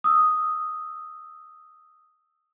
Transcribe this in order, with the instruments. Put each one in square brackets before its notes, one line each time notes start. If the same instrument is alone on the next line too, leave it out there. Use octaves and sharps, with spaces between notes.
[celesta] D#6 E6